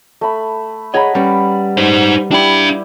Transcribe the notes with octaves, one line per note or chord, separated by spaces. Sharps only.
A3 B5
G#4 C#5 D#5 F#5 A#5 B5
G3 C#4 B4
D#4 C5
D4 E4 G4 D5 B5